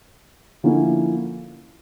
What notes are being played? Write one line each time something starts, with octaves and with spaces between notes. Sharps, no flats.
D3 F3 A#3 C#4 E4